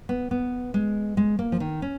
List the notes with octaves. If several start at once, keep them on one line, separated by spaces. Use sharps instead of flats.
B3
B3
G#3
G#3
A#3
F3
D#3
C#4